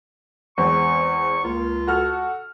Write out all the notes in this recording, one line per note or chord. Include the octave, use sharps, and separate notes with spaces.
E2 G#3 C4 C#6
C#2 A#3 F4
F#4 A4 F6